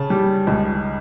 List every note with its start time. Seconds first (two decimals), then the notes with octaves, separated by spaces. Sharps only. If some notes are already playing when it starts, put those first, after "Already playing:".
Already playing: C#3 A5
0.10 G3
0.47 C#2